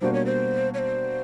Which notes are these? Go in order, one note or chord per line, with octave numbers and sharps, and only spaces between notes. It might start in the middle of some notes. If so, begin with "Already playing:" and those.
B2 G3 A#3 D4 F#4 C5
C#5
C5
C#5
C5